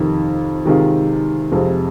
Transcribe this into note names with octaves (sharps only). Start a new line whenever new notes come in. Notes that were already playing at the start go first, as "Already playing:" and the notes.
Already playing: F2 C3 D#3
C3 D#3 G#3 F4
F2 C3 G#3